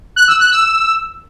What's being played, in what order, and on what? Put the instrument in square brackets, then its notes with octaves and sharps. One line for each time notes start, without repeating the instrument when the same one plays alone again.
[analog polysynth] F#6
E6
F#6
E6